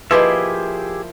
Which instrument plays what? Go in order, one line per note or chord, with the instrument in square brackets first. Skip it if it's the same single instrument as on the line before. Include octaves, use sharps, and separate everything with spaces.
[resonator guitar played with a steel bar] F3 A#3 E4 [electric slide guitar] G4 G#4 E5 [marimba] B4 D#5